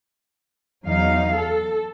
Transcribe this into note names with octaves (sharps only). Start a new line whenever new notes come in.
E2 F#3 D#4 F5
A4